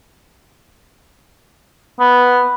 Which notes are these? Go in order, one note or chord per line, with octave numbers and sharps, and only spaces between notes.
B3